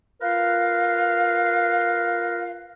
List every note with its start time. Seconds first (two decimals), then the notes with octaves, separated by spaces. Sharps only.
0.21 F4 A#4 B4 F5